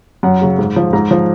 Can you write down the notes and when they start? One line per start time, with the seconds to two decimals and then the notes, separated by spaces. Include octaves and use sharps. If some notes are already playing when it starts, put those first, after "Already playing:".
0.23 F#2 F#5
0.41 C#3 F#3
0.59 G#2
0.76 F3
0.93 G#2 A#5
1.11 F3